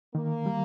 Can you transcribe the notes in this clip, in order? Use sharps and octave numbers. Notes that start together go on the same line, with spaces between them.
D#3 A#3
G3